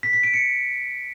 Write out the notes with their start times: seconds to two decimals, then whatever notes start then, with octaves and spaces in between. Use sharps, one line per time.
0.03 B6
0.13 B6
0.23 D7
0.34 C#7